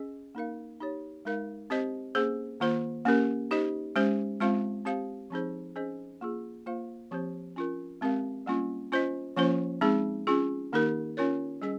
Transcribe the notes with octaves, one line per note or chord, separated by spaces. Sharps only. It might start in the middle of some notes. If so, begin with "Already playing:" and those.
Already playing: C#4 G#4 D#5
A#3 D#4 A#4 F5
D#4 G4 C#5
G#3 D#4 A#4 F5
C4 G4 C5 D#5
A#3 C#4 G#4 C5
D#3 A#3 F4 C5
A#3 C#4 G4 A#4
D#4 G4 C5 D#5
G#3 C#4 G4 C5
G#3 C4 F4 C5 F5
C4 G4 C5 F5
F3 C4 D#4 G#4 C5
C#4 G#4 C5 D#5
A#3 F4 G#4
A#3 F4 C5 F5
F3 C4 G4 C5
C#4 F4 A#4
G#3 C4 G4 A#4 F5
G3 A#3 C#4 F4
C#4 F4 C5 D#5
F3 A#3 C#4 F4 C5
G#3 C4 D#4 G#4
C#4 F4 G#4
D#3 A#3 D#4 G4 A#4
C#4 F4 A#4 C#5
G3 C#4 G#4 D#5